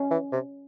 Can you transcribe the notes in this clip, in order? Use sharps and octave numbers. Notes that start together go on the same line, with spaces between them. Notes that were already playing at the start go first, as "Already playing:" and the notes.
Already playing: C#4
E3
C3